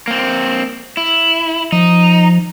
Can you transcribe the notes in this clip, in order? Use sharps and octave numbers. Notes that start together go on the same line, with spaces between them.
A#3 C4
E4
F3 D#4